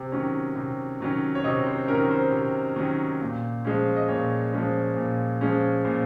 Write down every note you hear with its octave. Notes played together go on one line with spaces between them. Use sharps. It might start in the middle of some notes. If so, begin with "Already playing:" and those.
Already playing: C3
D#3 F#3 C#4
C3
D#3 F#3 C#4
C#5
C3 D#5
C5
D#3 F#3 C#4 A#4
C5
C3
D#3 F#3 C#4
A#2
F3 G#3 C#4
D#5
A#2 C#5
F3 G#3 C#4
A#2
F3 G#3 C#4
A#2 C5